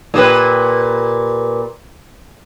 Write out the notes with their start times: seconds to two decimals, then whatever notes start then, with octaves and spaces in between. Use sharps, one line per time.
0.14 A#2 G4 B4